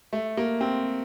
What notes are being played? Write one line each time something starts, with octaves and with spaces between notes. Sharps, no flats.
A3
A#3
C4